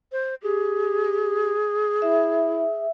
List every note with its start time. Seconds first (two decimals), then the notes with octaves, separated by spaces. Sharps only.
0.12 C5
0.43 G4 G#4
2.02 E4 E5